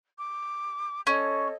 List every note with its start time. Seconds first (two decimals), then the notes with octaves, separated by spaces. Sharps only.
0.18 D6
1.07 C#4 A4 C#5 D#5